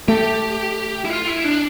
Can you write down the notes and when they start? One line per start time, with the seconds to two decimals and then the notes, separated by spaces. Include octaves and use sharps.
0.08 A3 G4
1.05 E4
1.10 F4
1.27 E4
1.44 D4